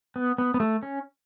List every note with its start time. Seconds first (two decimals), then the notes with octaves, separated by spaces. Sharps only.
0.16 B3
0.38 B3
0.54 B3
0.60 A3
0.83 C#4